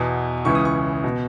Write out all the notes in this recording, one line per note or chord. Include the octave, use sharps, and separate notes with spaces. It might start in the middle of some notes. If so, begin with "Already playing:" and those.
Already playing: E2 B2
C#2 C#3 E3 C#6
D#6
C#6
B2